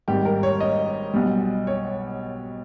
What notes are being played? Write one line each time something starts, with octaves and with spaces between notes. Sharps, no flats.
G#1 G#2 G3 G4
A#4
C#5
D#5
B1 B2 G3
C#5